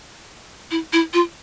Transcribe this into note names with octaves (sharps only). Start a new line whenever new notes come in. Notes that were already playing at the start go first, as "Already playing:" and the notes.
E4
E4
F4